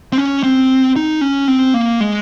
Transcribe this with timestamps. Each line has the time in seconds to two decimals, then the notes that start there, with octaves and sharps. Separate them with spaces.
0.12 C4
0.18 C#4
0.43 C4
0.96 D#4
1.21 C#4
1.48 C4
1.74 A#3
2.00 G#3